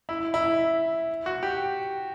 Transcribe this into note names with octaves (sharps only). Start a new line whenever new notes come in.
E4
E4
F#4
G4